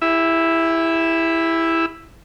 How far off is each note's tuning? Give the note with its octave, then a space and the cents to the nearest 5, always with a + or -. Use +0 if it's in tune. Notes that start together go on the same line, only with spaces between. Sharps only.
E4 +0 G4 +45 E5 +0